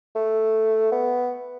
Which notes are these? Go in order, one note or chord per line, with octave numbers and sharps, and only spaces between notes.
A3
B3